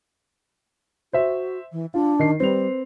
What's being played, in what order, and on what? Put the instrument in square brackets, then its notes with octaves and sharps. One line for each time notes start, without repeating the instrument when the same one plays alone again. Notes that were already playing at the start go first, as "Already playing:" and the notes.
[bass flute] F#4 [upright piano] C5 E5
[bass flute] E3
[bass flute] D4 [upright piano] F4
[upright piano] D#3 C7
[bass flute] G3 [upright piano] C4 B4 F7